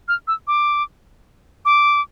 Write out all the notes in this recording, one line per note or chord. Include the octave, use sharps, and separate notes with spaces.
F6
E6
D6
D6